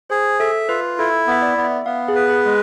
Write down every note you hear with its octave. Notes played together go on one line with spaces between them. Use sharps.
G#4 C5
A4 E5
F4 B4
E4 A4
B3 E5
D5
B3
E5
B3 F5
G#4
B4
G#4
G#3